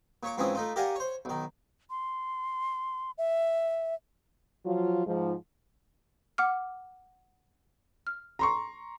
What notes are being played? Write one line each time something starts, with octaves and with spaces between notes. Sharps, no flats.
A#2 C#5 C#6 D6
G#2 E3 F3 C4 C#4 D#6
A3 D#4 F4
G4 A#4 D5 F5 F#5 G#5
C5 C#5
B1 D#3
C6
E5
F3 F#3 F4
G#2 F3
F#5 D6 F6
F6
A#5 C6 C#6